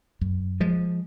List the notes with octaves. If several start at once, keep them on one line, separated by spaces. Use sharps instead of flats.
F#2
F3 G#3